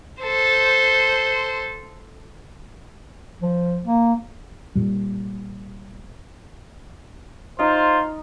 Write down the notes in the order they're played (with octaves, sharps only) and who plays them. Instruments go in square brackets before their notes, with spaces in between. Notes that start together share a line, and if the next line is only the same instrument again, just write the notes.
[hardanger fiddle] A4 C5
[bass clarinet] F3
A#3
[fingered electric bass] A#2 G3
[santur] D#4 [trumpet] F4 [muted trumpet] C5